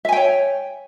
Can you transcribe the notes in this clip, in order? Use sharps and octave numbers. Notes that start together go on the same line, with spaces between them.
C#5 E5 G5 G#5